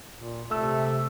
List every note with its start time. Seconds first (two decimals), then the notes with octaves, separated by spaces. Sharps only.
0.17 A#2
0.51 C3 A3 E6